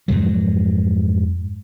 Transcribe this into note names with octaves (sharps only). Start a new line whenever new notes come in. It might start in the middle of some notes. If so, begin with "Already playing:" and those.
F2 G#2 F#3